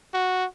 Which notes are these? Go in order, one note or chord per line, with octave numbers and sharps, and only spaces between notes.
F#4